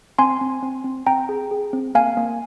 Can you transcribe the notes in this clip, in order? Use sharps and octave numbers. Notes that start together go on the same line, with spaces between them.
C4 G#5 C6
C4
C4
C4
C4 G5 A#5
G#4
G#4
C4
A#3 F5 G#5
A#3